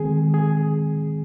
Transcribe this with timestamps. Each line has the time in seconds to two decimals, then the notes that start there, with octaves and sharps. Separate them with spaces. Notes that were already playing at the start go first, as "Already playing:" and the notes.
Already playing: D#3 G#3 C4 G#4
0.34 G#4